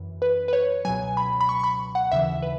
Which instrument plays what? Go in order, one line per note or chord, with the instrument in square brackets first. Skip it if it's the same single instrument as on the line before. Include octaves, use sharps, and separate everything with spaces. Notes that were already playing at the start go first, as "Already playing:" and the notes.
Already playing: [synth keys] F#2 E3
B4
B4
C#5
C#2 B2 F#3 G#5
B5
B5
C#6
C#6
B5
F#5
D#2 C#3 E3 E5
B4